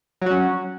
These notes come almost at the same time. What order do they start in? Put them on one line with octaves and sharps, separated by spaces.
F#3 F#4 C#4